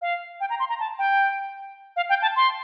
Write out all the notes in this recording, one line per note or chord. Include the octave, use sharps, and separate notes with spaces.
F5
G5
A#5
C6
A#5
A5
G5
F5
G5
A5
C6